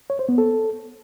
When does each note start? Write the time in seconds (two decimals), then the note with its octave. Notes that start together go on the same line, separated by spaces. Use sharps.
0.10 C#5
0.19 C5
0.29 B3
0.38 A4